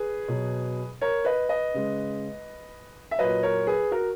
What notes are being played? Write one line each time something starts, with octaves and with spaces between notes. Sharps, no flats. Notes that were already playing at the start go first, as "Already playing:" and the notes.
Already playing: G#4 B4
B2 F#3
A#4 C#5
B4 D#5
B4 D#5
C#3 G#3
E5
A#2 F#3 B4 D#5
A#4 C#5
G#4 B4
F#4 A#4